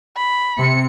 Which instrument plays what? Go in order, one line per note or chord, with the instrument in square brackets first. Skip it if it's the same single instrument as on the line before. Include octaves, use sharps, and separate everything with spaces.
[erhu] B5
[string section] C3 C#7